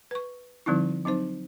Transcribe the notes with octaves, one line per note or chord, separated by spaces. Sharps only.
B4 C#6
D3 F3 G3 C4 D#4 E4
F#3 C4 D#4 C5